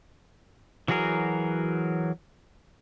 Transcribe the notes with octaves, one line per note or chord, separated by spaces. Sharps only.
E3 F#3 F#4 G#4 A#4